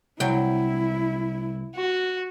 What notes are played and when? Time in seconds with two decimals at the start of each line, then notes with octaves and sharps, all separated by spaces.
0.20 C2 F#3 E4 G5
1.76 F#4